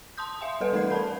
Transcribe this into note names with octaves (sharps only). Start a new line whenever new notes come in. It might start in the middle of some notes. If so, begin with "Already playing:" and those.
A5 C6 D#6 G6
E5 F5 G#5 C6
G3 A4 B4 F#5
E3 A3 D#4 A#4 G#6 C7
A#4 A5 B5 G6